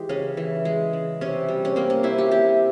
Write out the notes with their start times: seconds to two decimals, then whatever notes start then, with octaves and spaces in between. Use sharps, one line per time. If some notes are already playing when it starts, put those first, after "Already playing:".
Already playing: E3 G#3 G4
0.09 C#3 C#4
0.37 E3
0.65 G#3
0.93 C#3
1.21 C3 C#4
1.48 G3
1.65 C#4
1.76 A#3 C4
1.90 C#4
2.03 C3 E4
2.18 G4
2.31 C3 G4